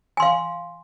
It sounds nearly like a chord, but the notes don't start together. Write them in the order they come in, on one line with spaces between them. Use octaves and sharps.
G#5 C6 F5